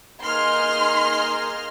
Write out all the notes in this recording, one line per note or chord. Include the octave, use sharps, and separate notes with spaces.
A#3 D#4 G#4 C6 F6